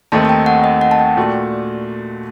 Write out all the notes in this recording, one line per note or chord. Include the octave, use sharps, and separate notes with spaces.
D#2 D#3 A3 C4 D#4 A5
A5
G5
F#5
D#5
F#5
A5
G5
A#2 A3 D4 F#4